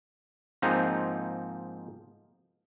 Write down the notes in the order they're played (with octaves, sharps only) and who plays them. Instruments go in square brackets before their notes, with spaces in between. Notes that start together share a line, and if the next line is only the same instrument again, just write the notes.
[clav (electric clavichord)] G#2 F3 A#3 C4 D#4